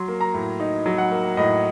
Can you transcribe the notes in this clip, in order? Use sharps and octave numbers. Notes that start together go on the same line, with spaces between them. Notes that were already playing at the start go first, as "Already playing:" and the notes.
Already playing: F#3 C6
A#3
A#5
A2
D#4
F#3
F#5
A#3
A2 D#5